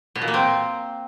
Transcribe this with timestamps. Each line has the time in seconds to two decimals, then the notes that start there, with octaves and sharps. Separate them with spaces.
0.15 B2
0.22 A#2
0.28 A#3
0.34 C4